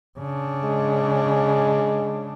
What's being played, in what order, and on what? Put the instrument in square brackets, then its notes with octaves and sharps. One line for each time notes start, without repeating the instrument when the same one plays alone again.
[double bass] C#3 D4
[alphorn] G#3